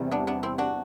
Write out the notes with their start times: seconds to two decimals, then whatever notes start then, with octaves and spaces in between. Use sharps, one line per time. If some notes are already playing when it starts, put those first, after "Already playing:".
Already playing: E2 C3 G3
0.11 B3 D4
0.27 B3 D4
0.43 C4 E4
0.58 D4 F#4